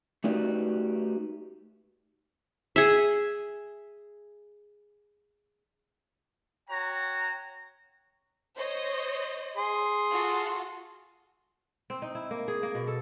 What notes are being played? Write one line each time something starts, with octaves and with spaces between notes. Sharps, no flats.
A3 D#4 F#4 G4 B4 D5
G#4 E5
F#4 C#5 G5 A#5
C5 C#5 D#5
G#4 C6
F4 F#4 A4
C4
D#4
E4
A#3
G#4
A#3
B2
A4